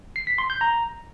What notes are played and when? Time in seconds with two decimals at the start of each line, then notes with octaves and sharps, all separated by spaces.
0.16 C7
0.27 B6
0.38 C6
0.50 G6
0.61 A#5